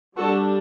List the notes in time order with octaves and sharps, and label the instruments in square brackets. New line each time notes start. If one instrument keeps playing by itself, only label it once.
[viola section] G3 D4 F#4 A4